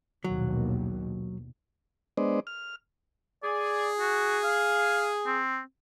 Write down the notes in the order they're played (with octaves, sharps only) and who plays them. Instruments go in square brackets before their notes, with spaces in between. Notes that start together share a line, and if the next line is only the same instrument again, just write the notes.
[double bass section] A#1 D#2 B2 [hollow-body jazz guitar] F#3
[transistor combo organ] G#3 B3 D4 C5 D5 D#5
F6
[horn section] G#4 [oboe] D5
[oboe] F#4
F5
C4